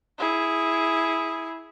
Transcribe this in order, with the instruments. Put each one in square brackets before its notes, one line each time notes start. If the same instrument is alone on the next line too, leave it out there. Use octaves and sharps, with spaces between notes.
[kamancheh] E4 G#4